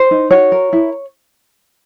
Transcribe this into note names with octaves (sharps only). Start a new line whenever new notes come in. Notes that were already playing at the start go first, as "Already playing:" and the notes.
Already playing: C5
D#4
F#4 C#5
A#4
E4